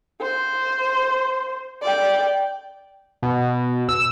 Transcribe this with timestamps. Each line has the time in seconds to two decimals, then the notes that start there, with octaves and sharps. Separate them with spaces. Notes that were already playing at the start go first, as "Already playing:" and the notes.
0.21 C5
1.82 D5 G5
3.23 B2
3.89 E6